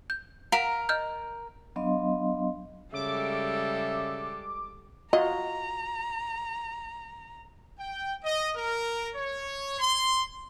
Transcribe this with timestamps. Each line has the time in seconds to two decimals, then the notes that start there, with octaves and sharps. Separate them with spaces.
0.10 G6
0.52 A#4 F5 F#5 A#5
0.89 D#5 F6 G6
1.76 F#3 B3 D4 D#5 F5 C6
2.94 C#3 G3 G#3 A4 E5 D6
5.13 F4 F#4 D#5 A#5
7.78 G5
8.24 D#5
8.55 A#4
9.15 C#5
9.79 C6